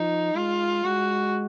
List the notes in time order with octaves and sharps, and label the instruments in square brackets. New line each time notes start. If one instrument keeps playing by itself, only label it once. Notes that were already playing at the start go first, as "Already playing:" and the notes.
Already playing: [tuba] F3 [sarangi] D#4
[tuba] G#3 [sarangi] F4
[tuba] G#3 [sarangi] F#4